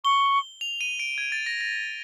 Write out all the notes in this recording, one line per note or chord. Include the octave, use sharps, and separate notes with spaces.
C#6 G7
F7
D#7
D7
G#6
A6
A#6
A#6